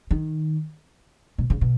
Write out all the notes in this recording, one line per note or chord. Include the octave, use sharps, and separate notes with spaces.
D#3
B2
C#3
B2